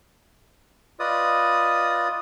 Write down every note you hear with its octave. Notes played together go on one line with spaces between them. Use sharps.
F4 B4 D5 D#5 D#6